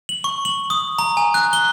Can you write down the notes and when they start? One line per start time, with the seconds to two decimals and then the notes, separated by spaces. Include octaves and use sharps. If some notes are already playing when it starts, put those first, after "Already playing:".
0.09 F#7
0.24 C#6
0.45 F#7
0.70 D#6
0.99 A#5
1.17 G#5
1.34 F#6
1.53 G7